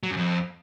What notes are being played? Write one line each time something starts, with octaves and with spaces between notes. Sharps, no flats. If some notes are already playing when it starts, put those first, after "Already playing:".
F#3
F#2
F2